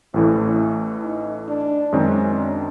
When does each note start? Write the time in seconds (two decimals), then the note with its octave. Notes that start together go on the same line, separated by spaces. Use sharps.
0.14 A1 A2 E3 A3 C4
0.44 C#4
1.04 D#4
1.48 D4
1.92 F#2 D#3 G#3 C4 C#4
2.37 D4